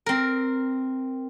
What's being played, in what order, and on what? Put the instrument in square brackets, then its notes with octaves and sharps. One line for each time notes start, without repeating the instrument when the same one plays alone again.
[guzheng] C4 A#4